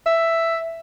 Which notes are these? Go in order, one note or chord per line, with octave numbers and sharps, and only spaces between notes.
E5